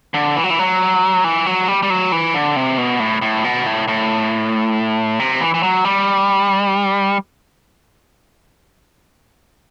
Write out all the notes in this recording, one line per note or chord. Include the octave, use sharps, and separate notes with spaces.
D3
E3
F#3
E3
F#3
E3
F#3
G3
G3
F#3
E3
D3
C3
B2
A2
A2
B2
A2
A2
C3
E3
E3
F#3
G3